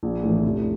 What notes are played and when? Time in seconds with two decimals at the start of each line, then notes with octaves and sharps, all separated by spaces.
0.03 A#1
0.23 A2 E3
0.43 F1